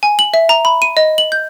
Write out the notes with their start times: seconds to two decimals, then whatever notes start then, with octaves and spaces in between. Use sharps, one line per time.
0.03 G#5
0.19 F#7
0.34 E5
0.49 A#5
0.65 B5
0.82 D#7
0.97 D#5
1.18 F#7
1.32 G6